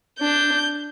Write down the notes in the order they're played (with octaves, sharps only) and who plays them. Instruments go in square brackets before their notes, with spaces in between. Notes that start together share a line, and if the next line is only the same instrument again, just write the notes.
[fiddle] D4 [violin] G6